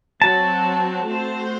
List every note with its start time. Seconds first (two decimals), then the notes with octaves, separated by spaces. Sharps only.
0.22 F#3 C4 F#4 A5
1.07 A3 C4 F#4 C5